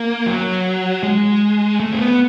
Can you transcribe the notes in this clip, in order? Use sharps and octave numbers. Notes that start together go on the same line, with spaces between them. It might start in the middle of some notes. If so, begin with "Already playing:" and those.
Already playing: A#3
F#3
G#3
A3
C4
B3